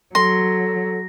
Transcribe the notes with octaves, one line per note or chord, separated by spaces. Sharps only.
F#3 A4 C6 A#6